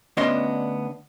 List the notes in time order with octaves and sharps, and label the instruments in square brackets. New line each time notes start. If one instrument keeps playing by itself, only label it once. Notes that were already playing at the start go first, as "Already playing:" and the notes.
[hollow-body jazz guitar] D2 B3 C#4 D4 D#5 C6